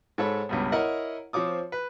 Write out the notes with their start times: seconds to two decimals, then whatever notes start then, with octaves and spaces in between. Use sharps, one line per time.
0.18 G#2 A4 C#5 B5
0.49 C#2 G2 B2
0.72 E4 A#4 C#5 D#5 F#5
1.33 F3 C4 C#5 D6 D#6
1.72 B4